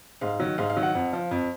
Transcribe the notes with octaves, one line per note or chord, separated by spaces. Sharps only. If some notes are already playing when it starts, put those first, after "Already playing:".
G#2 F5
D#3 F#3
G#2 F5
F5
D#3 F#3
F#5
F2
F3
F2